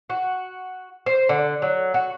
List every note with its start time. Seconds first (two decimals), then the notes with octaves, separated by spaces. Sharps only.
0.10 F#4
1.06 C5
1.29 D3
1.62 F#3
1.94 F#4